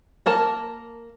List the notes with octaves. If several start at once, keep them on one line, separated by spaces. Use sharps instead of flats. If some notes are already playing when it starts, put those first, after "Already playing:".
A#3 A#4 A5